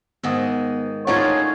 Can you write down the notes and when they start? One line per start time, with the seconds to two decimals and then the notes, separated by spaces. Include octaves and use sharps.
0.23 G#2 D#3 B3 F#5 D#6
1.07 A2 C#4 D#4 F4 G#4 C#5 D5 F#5